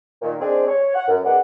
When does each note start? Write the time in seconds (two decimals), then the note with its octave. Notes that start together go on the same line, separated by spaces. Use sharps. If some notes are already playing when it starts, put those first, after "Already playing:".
0.21 A#2 D#3
0.40 G#3 C4 D4 G#4
0.67 C#5
0.94 F#5
1.07 F#2
1.24 B3 D#4 G#4 D5 F#5